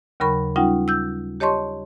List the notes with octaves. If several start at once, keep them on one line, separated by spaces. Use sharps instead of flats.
D#2 C#3 F#3 A#4 B5 C#6
G3 C#4 D#4 F4 F#5 G5
E6 G6
G4 C#5 D#5 A5 C6 C#6